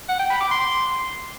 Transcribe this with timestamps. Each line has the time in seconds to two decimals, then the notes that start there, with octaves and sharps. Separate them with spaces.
0.09 F#5
0.20 G5
0.30 B5
0.41 D6
0.51 C6